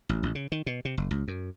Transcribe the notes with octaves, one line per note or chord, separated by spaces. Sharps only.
A1
A1
C#3
D#3
B2
C3
F#1
C#2
F#2